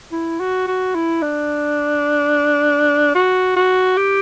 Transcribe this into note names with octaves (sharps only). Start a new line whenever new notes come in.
E4
F#4
F#4
E4
D4
F#4
F#4
G4